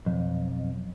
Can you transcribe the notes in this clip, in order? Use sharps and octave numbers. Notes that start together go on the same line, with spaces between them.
B1 F2